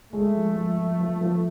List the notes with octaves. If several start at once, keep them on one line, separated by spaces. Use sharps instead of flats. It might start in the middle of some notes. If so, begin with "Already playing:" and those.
G#3 A3
F3
F3
F3
F3
F3